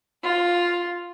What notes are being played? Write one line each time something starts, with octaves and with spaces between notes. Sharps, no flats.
F4